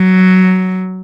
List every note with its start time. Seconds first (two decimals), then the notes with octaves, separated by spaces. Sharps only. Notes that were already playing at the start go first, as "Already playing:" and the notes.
Already playing: F#3